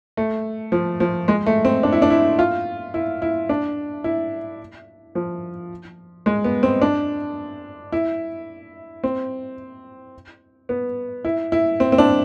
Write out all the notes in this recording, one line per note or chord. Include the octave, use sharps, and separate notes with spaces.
A3
F3
F3
G#3
A3
C4
D4
E4
D4
E4
F4
E4
E4
D4
E4
F3
G#3
B3
C4
D4
E4
C4
B3
E4
E4
C4
C4
D4